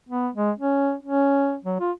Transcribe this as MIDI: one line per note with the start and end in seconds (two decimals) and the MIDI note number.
0.09 0.29 59
0.35 0.51 56
0.58 0.94 61
1.03 1.56 61
1.64 1.79 54
1.80 1.91 65